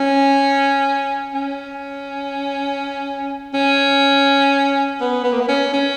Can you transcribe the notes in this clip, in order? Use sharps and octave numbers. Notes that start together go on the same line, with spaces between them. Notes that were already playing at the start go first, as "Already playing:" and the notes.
Already playing: C#4
C#4
C#4
B3
B3
A#3
B3
C#4
C#4